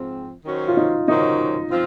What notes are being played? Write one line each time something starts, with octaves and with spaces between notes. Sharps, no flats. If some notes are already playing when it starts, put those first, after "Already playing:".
Already playing: G#2 F3 C4
D#3 F#3 C#4 F#4 C5
F4
D#4
D#3 F#3 C#4 D#4 F#4 C5
F3 C4 F4